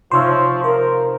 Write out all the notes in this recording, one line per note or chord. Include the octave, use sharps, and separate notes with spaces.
C3 F3 D#4 F4 C5 C#5 E5
A#4 C5